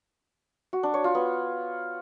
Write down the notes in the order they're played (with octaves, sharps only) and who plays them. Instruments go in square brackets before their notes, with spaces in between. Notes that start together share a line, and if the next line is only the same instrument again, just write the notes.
[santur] F#4
D4
C#5
F4
B3